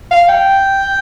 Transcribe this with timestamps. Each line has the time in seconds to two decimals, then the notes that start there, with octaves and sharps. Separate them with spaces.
0.11 F5
0.28 G5